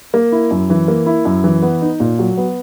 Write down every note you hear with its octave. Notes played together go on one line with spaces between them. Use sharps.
A#3
E4
F#2
E3
A#3
E4
F#2
E3
B3
D#4
A#2
F#3
B3